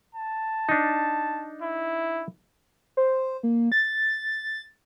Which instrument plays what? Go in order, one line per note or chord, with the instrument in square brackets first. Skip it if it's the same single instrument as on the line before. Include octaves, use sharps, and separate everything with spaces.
[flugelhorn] A5
[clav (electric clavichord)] D4 D#4
[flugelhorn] E4
[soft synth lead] C5
A#3
A6